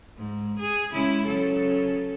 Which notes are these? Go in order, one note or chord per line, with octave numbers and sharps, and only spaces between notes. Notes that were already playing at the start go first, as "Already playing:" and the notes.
G#2
G#4
C#3 G#3 E4
C#3 F#3 A4